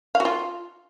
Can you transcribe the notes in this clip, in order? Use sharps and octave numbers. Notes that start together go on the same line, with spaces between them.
F5
F#4
F4